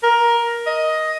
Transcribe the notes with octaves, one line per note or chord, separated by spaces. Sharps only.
A#4
D#5